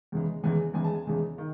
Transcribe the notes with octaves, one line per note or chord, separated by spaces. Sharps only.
E2 C#3 E3 G#3
E2 C#3 E3 G#3 G#5
E2 C#3 E3 G#3 G#5
A5
G#5
E2 C#3 E3 G#3
D#3